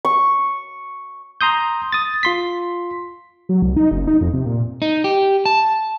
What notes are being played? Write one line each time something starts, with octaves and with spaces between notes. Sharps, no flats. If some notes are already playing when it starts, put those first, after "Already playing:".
C#6
A#5 C6 D#6 G6
D#6 A6
F4 C6 B6
F#3
C2
D#4
F#1
D#4
F2
C3
A#2
D#4
G4
A5